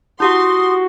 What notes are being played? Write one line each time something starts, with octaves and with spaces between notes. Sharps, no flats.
E4 F#4 G4 F#5 C6 D#6